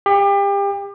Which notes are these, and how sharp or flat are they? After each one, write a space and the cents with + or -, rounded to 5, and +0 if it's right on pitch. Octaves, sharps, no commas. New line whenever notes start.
G4 +30